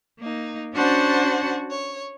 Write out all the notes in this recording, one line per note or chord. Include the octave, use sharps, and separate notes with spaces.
A#3 D#4
C#4 D4 F#4 C5 F#5 A5
C#5